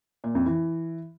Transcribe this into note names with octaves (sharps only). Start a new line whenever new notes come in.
A#2
F2
E3